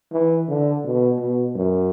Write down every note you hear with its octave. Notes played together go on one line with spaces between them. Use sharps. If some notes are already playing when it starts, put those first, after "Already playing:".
E3
D3
B2
B2
F#2